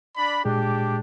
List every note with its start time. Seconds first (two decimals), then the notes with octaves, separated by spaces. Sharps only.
0.17 D4 D5 B5
0.45 A#2 G#3 D4 G4 G#4